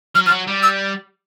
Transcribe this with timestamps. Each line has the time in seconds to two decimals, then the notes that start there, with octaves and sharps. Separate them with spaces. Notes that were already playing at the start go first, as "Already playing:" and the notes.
0.15 F#3 F6
0.25 F3 F6
0.31 F#3
0.47 G3
0.63 E6